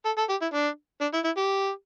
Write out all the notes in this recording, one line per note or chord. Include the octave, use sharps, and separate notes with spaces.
A4
A4
G4
E4
D4
D4
E4
E4
G4